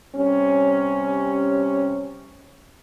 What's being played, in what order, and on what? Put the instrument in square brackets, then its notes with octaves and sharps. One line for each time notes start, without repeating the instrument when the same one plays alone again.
[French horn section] C3 G3 C#4